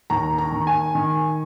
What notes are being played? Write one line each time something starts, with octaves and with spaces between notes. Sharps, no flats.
D#2 A#5
A#5
D#3
G#5
D#3